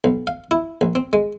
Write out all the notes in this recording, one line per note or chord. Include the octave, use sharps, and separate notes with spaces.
B1
F5
E4
A#1
C4
G#3